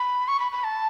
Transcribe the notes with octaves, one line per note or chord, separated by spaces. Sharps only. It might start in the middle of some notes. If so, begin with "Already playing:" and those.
Already playing: B5
C#6
B5
B5
A5